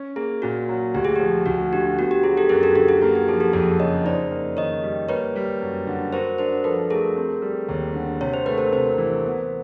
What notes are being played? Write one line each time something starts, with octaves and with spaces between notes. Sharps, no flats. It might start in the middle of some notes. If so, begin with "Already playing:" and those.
Already playing: C#4
A#3 G#4
A#2 F#4
F#3
D2 G4
G#4
F3 G4
D2 F#4
D3 G4
B3 F#4
G4
F#3 G#4
G4 A4
F#2 G#4 A#4
G4 A4
D3 G4 A4
G#4
A#3 F#4
G4
F3 G#4
G4 A4
F2 G#4 A#4
C#3 C#5 D#5
D#4 C5 D5
A#3
D#3 C#5 D#5
G3
A#3 B4 C#5
G3
F#2
D3
F#4 A#4 C5
D4 A#4 C5
F3 A4 B4
A3 G#4 A#4
C4
G3
D#2
D3
C3 C#5
C5
A3 B4
A#4 C5
C3 A#4 C5
E3
B3